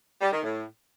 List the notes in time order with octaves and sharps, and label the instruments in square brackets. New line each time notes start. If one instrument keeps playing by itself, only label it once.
[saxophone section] G3
D#3
A2